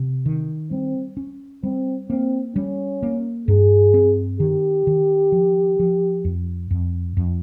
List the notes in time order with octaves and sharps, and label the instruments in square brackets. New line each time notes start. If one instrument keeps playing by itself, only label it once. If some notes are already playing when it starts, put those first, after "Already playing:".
Already playing: [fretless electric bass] C3
D#3
[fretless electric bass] G3 [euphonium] C4
[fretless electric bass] C#4
[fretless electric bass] G3 [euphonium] C4
[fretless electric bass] A#3 [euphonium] C4
[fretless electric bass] G3 [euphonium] C#4
[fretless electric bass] A#3
[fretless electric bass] G2 [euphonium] G#4
[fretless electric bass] C4
[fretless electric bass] D#3 [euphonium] G4
[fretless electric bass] D#3
F3
F3
F2
F2
F2